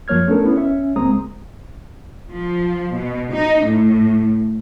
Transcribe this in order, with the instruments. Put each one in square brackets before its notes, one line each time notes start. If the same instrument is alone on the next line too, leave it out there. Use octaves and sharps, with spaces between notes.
[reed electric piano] F#2 F3 A#3 C#5 F6 G#6
A3 B3 C#4 D4 A4 A#4
B3 C#4 E4
C#4 E5
C#2 G#3 A#3 C4 A#5 D#6
[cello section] F3
B2
D#4
A2